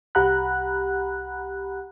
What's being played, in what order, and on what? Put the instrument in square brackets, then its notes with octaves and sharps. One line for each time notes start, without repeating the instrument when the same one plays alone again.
[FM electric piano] C2 G4 F#5 A#5 B5 F#6